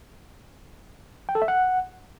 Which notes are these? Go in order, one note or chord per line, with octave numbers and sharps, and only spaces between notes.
G5
A4
E5
F#5